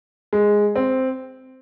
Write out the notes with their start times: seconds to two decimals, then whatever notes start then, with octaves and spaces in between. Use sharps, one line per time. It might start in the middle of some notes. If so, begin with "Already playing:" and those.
0.33 G#3
0.75 C4